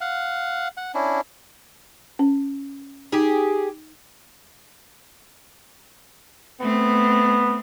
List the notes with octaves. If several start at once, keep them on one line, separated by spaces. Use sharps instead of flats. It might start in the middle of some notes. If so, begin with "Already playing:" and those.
F5 F#5
F#5
C#4 D4 E4
C#4
D#4 G4 G#4
A3 B3 C4